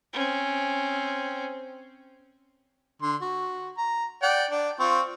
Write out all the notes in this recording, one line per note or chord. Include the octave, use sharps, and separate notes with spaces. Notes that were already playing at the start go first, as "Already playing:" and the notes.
C4 C#4
D3 C6
F#4
A#5
D5 F#5 G5
D4
C4 F4 C#6